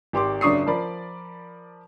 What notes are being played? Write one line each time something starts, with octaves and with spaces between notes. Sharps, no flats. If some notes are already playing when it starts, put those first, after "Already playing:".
G#1 G4 C6 D6
F#1 F#3 D4 C#6 D#6 C7
F3 A#4 D5 B5